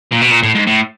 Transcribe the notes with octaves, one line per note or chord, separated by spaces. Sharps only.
A#2
B2
A#2
A2
G#2
A2